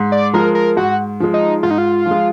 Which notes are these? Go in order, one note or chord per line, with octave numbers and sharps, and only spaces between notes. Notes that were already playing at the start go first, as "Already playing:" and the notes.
Already playing: G#2
D5
F3 G#3 A#4
A#4
G#2 F#4
F3 G#3
D#4
G#2 F4
D#4
F4
F3
G#3